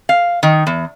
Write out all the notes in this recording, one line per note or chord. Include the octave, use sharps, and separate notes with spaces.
F5
D#3
E2